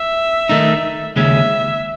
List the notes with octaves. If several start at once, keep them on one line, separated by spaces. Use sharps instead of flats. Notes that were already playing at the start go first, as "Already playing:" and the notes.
Already playing: E5
D#3 A3 D#4
D#2 C#3 G#3 C#4 E5